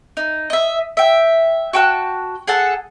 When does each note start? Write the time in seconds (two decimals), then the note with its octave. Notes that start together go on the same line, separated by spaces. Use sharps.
0.17 D#4
0.50 D#5 E5
0.97 E5 G5
1.73 F#4 G5 A5 F#6
2.47 G#4 A4 F#5 A5